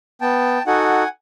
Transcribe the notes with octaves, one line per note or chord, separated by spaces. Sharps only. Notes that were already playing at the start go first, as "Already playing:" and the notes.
B3 G5 A5
D#4 F#4 A4 F#5 G#5